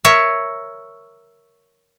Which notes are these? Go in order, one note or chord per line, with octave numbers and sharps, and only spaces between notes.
A#4 C#5 E5